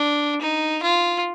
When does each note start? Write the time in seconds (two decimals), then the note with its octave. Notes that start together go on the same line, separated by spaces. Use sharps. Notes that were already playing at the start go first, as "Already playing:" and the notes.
Already playing: D4
0.42 D#4
0.83 F4